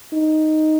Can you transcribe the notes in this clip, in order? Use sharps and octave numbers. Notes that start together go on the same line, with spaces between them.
D#4